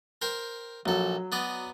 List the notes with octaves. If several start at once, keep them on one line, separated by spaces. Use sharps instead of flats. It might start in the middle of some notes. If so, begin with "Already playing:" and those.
A#4 C5 G5
A#1 F#3 A4
B3 D5 D#5